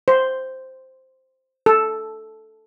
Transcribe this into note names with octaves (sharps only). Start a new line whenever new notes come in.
C5
A4